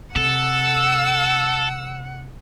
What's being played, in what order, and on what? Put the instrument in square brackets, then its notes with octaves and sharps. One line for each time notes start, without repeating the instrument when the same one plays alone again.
[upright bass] C3 [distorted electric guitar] A4 [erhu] F#5 [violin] E6